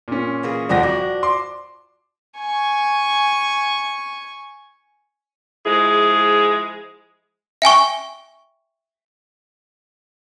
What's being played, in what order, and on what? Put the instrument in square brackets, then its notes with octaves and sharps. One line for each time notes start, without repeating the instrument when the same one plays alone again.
[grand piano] A#2 C#4
[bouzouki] E3 A#3 G#4
[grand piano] D#1 F2 A#6 [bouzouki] D3 F3 D4
[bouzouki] F3 D4 [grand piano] F#4
[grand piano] C6 D6
[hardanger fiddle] G#5 C#6
[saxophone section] F3 G#3 E4 G#4
[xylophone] E5 G5 G#5 C#6